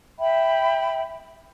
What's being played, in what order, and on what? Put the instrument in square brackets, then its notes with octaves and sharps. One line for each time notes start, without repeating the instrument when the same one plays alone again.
[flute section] E5 G5 B5